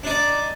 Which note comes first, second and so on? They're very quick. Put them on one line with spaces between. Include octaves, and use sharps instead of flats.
D4 D#4 D5